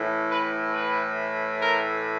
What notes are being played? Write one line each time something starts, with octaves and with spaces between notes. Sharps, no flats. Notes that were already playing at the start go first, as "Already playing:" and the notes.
Already playing: A2 E3
B4
B4
A#4